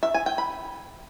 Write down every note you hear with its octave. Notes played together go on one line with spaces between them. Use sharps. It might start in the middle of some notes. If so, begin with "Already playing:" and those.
E5
G#5
G5
B5